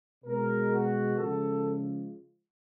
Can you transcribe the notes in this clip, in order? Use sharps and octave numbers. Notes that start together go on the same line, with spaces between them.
B2 G#3 A#4
F#4
C#3 F3 G#3 A4